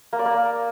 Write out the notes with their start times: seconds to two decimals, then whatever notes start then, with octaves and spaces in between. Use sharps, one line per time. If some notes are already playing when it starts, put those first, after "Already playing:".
0.13 A#3
0.19 D5
0.26 A#3